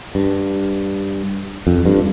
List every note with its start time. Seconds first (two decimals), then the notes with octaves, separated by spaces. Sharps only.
0.15 G2
1.67 F2
1.85 G2